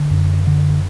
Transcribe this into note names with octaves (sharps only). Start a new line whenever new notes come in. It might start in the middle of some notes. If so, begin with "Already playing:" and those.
Already playing: D3
F#2
D3